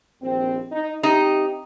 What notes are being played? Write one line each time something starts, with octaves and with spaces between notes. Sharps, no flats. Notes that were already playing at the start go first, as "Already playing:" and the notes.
A#1 D#2 C4
D#4
C4 D#4 G4